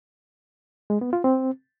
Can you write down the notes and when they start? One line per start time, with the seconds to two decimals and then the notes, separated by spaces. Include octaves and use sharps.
0.90 G#3
1.01 B3
1.13 F4
1.24 C4